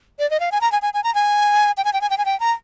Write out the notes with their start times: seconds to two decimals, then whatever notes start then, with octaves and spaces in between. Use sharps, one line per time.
0.19 D5
0.31 D#5
0.40 F5
0.52 G#5
0.61 A#5
0.72 G#5
0.82 G#5
0.94 G#5
1.04 A#5
1.15 G#5
1.77 G5
1.85 G#5
1.93 G5
2.01 G#5
2.10 G5
2.18 G#5
2.25 G5
2.40 A#5